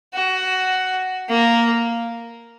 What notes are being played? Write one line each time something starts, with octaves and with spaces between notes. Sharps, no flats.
F#4
A#3